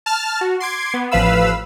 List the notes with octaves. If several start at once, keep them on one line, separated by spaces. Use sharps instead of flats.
A5 F6
F#4
C6 D6 G#6
B3
A1 F3 B4 F5 B5 E6